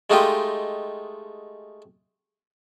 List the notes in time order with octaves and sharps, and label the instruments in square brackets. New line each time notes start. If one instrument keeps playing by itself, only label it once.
[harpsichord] G#3 A3 D#4 F4 G4 D#5